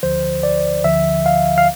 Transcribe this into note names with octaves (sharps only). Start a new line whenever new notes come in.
D2 D3 F3 C5
D5
D2 D3 F3 E5
F5
F5